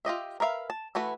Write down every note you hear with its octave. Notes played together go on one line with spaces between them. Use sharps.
F4 G4 D#5 E5
A#4 B4 E5 F5
A5
E3 A3 F#4 B4